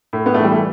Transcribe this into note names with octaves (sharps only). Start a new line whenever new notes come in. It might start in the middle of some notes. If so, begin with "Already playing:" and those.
A2
B3
A3
E3 G3
A3